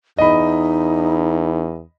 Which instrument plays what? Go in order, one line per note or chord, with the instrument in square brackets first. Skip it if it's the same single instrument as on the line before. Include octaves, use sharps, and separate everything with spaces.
[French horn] E2 [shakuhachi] D#4 [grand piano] D#5 B5